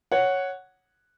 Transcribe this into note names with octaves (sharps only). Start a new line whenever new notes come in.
C#5 F#5